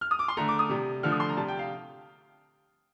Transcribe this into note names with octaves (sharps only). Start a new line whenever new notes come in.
F6
D#6
D6
C6
D3 A3 A#5
D6
D#6
C3 G3
D3 F3 A3 F6
D#6
C6
A#5
C3 G3 A5
G5
F5